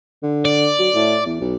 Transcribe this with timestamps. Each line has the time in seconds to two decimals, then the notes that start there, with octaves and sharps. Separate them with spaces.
0.23 D3
0.45 D5
0.79 F#3
0.95 A2
1.26 E2
1.41 B1